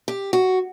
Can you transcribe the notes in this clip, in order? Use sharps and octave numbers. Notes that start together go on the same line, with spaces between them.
G4
F#4